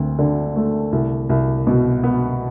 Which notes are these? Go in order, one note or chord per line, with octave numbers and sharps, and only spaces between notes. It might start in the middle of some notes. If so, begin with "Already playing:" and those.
Already playing: D2 C4
D3
A3
C2
C2
B2
B3